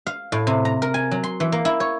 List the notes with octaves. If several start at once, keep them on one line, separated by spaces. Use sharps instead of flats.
F5
A2
C3
A#5
A#4
G#5
F#3
C6
E3
A#3
E4
C#5